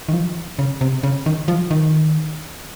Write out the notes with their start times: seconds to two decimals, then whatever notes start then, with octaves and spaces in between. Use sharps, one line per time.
0.09 D#3
0.13 F3
0.59 C#3
0.81 C3
1.03 C#3
1.26 D#3
1.48 F3
1.71 D#3